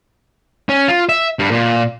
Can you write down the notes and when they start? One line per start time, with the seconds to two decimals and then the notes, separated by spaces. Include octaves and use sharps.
0.69 C#4
0.88 F4
1.09 E5
1.39 G2
1.51 A#2